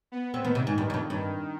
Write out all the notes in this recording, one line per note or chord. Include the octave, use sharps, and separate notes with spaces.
B3
C4
D#3 B3
C3
G#2
G2
G2
F2
G2 D#3